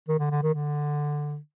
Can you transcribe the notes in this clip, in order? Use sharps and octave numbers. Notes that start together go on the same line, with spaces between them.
D#3
D3
D3
D#3
D3